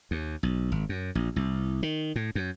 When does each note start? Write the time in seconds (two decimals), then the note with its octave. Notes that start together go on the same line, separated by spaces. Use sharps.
0.11 D#2
0.43 B1
0.72 G#1
0.89 F#2
1.15 A#1
1.36 C2
1.83 D#3
2.16 A2
2.35 F#2